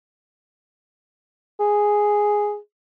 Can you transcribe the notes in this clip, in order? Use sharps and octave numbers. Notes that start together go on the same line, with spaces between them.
G#4